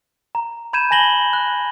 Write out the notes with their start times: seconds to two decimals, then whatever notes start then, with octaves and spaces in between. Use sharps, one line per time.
0.35 A#5
0.73 B5 G6 G#6 D#7 E7
0.91 G#5 A5 A#6 F#7 G7
1.33 F#6